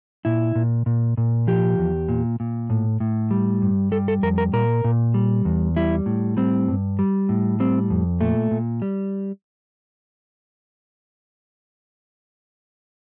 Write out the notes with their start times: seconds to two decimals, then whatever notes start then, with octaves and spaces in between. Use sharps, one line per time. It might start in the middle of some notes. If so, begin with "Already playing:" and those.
0.25 A#2 E4
0.55 A#2
0.86 A#2
1.17 A#2
1.47 F3 G4
1.79 E2
2.09 A#2
2.40 A#2
2.70 A2
3.00 A2
3.31 G3
3.62 G2
3.91 G3 A4
4.08 A4
4.23 F2 A#4
4.38 A#4
4.53 A#2 A#4
4.84 A#2
5.14 G3
5.45 E2
5.76 G3 E4
6.06 A2
6.37 G3 C4
6.68 G2
6.99 G3
7.29 A2
7.60 G3 C4
7.90 F2
8.21 A#2 A3
8.51 A#2
8.82 G3